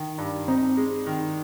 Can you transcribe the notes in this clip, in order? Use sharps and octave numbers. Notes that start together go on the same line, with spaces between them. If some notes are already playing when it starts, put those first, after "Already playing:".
Already playing: D#3
G2
C4 D#4
G#3
D#3